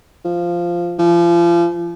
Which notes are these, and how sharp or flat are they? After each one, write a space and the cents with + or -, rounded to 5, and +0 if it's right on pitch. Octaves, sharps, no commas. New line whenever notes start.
F3 -10
F3 -35